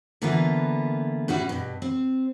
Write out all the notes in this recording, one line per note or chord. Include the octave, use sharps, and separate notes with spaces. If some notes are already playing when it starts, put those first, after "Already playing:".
D3 E3 A#3 B3 F4 B4
A2 G3 C#4 F#4
G2 B2
C4